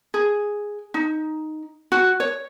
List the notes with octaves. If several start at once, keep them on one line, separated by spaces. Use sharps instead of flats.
G#4
D#4
F#4
C#5